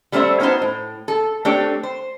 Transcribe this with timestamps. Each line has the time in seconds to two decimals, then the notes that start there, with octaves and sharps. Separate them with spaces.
0.12 G3 A3 C#4 G#4 C5 E5
0.40 B3 C#4 D#4 F#4 C5 A5
0.62 A2
1.08 A4
1.45 A3 C4 D4 G4 C#5
1.83 C5